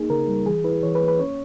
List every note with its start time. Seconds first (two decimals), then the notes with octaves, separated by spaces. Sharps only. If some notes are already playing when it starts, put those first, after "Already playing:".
Already playing: A#3 D#4 G#4
0.10 C#3 A#4
0.28 G3
0.46 E3 G#4
0.64 E4 B4
0.83 E3 C#5
0.95 B4
1.01 A#3
1.08 B4
1.19 C#4 C#5